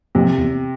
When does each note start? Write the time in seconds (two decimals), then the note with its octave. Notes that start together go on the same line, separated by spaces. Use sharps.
0.15 F2 C3
0.38 E2